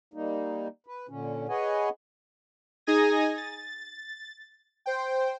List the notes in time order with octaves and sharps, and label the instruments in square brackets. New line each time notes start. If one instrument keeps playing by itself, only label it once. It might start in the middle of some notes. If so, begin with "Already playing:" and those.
[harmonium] G3 A#3 D#4
B4
A#2 D3 C#4
G#4 B4 C#5 D#5 F#5 G#5
[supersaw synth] D#4 G#4 G#5 D#6 G#6 A#6
A6
C5 G5